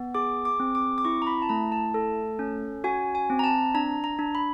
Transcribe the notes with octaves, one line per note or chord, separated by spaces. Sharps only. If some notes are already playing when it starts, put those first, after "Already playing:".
Already playing: B3
G#4 D6
D6
C4
D6
D6
E4 C#6
A#5
B5
A5
A3 A#5
A5
A4
C#4
F#4 G#5
G#5
C4
A#5
A5
D4 A#5
A#5
D4
B5